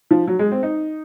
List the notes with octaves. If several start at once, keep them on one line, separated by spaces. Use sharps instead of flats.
F3
F#3
G#3
C4
D#4